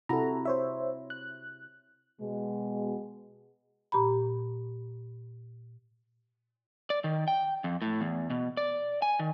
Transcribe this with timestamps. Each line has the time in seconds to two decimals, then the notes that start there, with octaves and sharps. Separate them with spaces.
0.09 C3 E4 F#4 A4 A#5
0.45 C5 C#5 E5
1.10 F#6
2.21 B2 G#3
3.92 A#2 G4 A#5 B5
6.90 D5
7.04 D#3
7.28 G5
7.64 F2
7.82 A2
8.01 E2
8.30 B2
8.57 D5
9.02 G#5
9.19 D#3